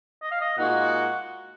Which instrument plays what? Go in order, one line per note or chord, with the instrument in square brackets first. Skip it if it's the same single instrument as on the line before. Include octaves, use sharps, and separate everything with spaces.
[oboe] D#5
F5
D#5
[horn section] A#2 G#3 D#4 F#4 [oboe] F#5